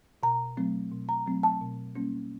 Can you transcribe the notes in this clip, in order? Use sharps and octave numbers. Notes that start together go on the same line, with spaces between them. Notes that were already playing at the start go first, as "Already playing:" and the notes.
B2 A#5
F#3 A3 C4
B2
A#5
F#3 A3 C4
A5
B2
G3 A#3 C#4